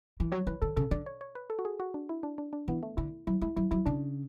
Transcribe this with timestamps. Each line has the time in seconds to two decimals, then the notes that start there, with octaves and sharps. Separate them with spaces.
0.20 E3
0.32 F#3 C#5
0.47 E3 B4
0.62 D3 A4
0.76 C#3 A4
0.91 D3 D5
1.06 C#5
1.21 C#5
1.35 B4
1.50 A4
1.59 F#4
1.65 G#4
1.80 F#4
1.94 D4
2.09 E4
2.23 D4
2.38 D4
2.53 D4
2.68 E3 B3
2.83 A3
2.97 D3 E4
3.27 F#3 E4
3.41 G#3 E4
3.56 F#3 E4
3.71 F#3 E4
3.86 C#3 D4